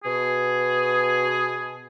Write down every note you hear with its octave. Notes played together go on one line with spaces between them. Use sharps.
B2 G#4